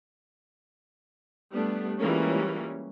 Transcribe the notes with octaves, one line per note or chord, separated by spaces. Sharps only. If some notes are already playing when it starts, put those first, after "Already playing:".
G3 A3 B3 D4
E3 G3 G#3 A#3 C#4 F4